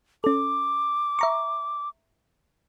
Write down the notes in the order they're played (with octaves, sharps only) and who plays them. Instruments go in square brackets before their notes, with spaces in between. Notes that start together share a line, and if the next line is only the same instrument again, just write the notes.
[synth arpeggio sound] C#4 A4 [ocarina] D6
[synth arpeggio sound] E5 A#5 C#6